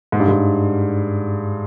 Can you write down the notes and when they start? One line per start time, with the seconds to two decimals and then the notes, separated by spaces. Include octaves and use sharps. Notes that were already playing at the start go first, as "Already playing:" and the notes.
0.12 G#2
0.20 G2
0.28 G#2